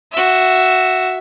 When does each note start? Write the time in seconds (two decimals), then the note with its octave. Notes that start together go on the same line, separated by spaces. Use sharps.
0.13 F#4 E5